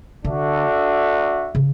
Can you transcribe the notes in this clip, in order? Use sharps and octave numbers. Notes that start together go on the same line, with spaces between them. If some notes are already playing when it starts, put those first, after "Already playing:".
D3 D4 F#4 A4 E5
C#3